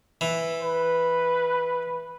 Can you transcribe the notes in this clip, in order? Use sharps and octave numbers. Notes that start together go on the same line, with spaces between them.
E3
B4